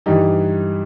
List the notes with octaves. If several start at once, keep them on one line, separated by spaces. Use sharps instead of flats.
G2 E3 G3 D#4